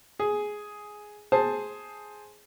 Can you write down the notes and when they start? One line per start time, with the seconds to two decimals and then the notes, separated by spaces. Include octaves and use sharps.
0.20 G#4
1.32 G#4 C5 A5